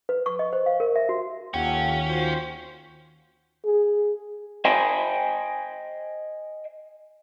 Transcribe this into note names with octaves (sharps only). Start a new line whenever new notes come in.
B4
C#6
D#5
C5
F5
A#4
E5
F#4
D#2 C#4 F4 G4 A4 F#5 G5
F4 F#4 C5
G#4
C5 D#5 G5 G#5